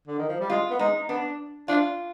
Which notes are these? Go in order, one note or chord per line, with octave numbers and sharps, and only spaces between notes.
D3
D#3
F3
G3
G#3 F4
B3
G#3 D#4
B3 D4
D4 F4